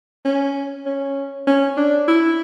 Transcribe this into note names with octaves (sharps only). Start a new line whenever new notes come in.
C#4
C#4
C#4
D4
E4